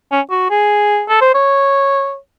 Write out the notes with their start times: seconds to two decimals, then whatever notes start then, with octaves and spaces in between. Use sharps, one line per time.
0.12 C#4
0.30 F#4
0.50 G#4
1.09 A4
1.21 C5
1.34 C#5